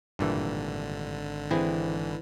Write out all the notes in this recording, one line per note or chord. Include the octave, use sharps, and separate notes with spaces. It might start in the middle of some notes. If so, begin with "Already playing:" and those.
G#1 G2 A#2 D3 E3
E3 C4 E4 G#4